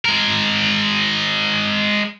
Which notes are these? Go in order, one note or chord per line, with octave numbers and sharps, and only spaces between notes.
G#3 A#4